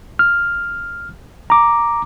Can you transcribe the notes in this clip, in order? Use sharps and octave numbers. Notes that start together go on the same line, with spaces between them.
F6
A#5 D6